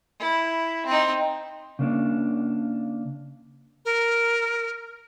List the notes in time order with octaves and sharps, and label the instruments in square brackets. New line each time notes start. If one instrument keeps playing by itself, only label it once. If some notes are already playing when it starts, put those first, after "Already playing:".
[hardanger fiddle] E4
C4 D#4
[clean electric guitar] C#3 A#3 D4
[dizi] A#4